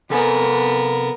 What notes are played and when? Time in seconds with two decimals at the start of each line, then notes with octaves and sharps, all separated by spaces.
0.10 C3 B3 A4 A#4 G#5